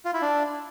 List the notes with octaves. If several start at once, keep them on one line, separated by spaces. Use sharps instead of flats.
F4
E4
D4